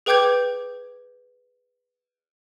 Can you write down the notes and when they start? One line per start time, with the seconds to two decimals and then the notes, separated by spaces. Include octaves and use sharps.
0.06 G#4 B4 G5 D6 G6 G#6